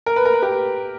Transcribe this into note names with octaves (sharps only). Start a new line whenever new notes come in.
A#4
B4
A#4
B4
G4 A#4